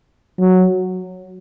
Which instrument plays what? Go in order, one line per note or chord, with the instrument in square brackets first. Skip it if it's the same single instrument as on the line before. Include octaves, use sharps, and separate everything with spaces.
[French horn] F#3